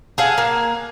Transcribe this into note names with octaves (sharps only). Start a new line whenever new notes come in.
G#4 A4 F5 F#5
A#3